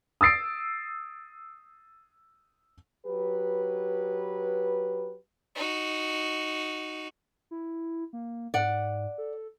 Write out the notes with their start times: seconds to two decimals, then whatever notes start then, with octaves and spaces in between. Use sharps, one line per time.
0.21 D#6 E6 A6 C7 D7
3.05 F#3 G4 B4
5.55 D#4 F#4
7.51 E4
8.13 A#3
8.54 G#2 D5 F#5
9.18 A4